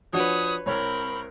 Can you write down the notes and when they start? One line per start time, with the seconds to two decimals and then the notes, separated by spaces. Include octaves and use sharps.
0.13 F3 D4 F#4 B4 C#5 D#6
0.66 C2 C4 A#4 C#5 B5